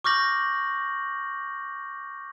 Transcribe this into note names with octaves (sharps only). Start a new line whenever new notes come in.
C#6 D6 F6 G6 A#6 F#7